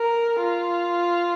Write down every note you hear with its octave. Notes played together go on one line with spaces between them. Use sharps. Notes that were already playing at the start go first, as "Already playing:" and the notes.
Already playing: A#4
F4